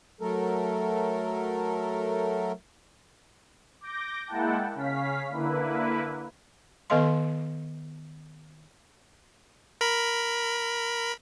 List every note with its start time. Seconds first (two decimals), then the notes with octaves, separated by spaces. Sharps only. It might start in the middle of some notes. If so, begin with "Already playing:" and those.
0.21 F#3 A3 A4 A#4
3.81 D6 G6 A#6
4.27 G#3 A#3 E4 F#5 G5 A5
4.75 C#3 C#4 F5 B6
5.29 D3 A#3 E4 B4
6.90 D#3 B3 A4 D#5 F5 C6
9.81 A#4 B5